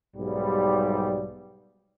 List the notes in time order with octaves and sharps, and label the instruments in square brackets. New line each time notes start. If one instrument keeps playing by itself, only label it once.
[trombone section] B1 G#2 G3